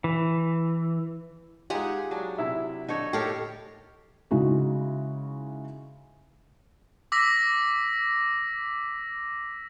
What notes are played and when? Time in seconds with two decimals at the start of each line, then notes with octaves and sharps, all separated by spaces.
0.04 E3
1.70 G#3 D#4 F4 G4 F#5 G#5
2.11 F#3 D4
2.38 C3 E4 E5
2.88 D3 D#4 A4 C#5
3.13 A2 G4 A4 A#4 C#5 F5
4.31 C#3 G#3 D#4 E4 F#4
7.12 D6 E6 A#6 B6